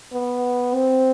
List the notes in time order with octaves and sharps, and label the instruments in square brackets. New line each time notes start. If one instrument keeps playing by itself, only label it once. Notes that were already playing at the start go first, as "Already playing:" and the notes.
[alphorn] B3
C4